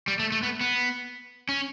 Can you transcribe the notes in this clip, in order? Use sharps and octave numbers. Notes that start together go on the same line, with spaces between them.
G3
A3
A3
B3
B3
C#4